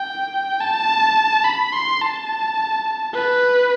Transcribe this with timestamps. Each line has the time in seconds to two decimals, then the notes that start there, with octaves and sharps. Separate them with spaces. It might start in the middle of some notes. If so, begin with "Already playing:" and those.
Already playing: G5
0.60 A5
1.44 B5
1.73 C6
2.01 A5
3.13 B4